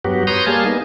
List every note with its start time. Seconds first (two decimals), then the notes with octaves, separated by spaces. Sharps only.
0.05 G2 F#3 B3 F#4 G4
0.27 B4 C#5 A#5 C6 D#6 G6
0.46 G3 A#3 G#4 F5 G#5 A5
0.65 A#3 B3 D#4